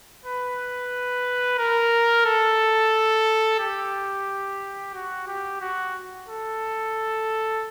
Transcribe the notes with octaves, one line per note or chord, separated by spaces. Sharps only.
B4
A#4
A4
G4
F#4
G4
F#4
A4